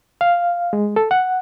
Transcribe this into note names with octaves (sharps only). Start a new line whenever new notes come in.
F5
G#3
A4
F#5